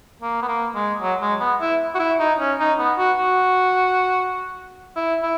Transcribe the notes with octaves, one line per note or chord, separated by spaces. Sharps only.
A#3
B3
A#3
G#3
F#3
G#3
B3
E4
F#4
E4
D#4
C#4
D#4
B3
F#4
F#4
E4
E4